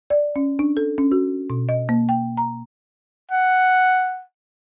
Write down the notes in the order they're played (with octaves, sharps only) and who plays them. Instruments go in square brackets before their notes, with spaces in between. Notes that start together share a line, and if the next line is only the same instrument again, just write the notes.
[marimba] D5
C#4
D4
A4
C#4
F#4
B2
D#5
A#3
G5
A#5
[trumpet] F#5